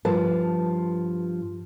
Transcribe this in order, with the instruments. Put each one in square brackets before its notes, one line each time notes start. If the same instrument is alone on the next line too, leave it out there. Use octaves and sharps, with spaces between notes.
[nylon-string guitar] G2 F3 B4 A5